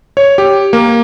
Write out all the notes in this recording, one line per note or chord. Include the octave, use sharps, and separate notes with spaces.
C#5
G4
A#3